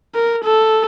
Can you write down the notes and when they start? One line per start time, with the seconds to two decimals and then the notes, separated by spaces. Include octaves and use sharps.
0.15 A#4
0.44 A4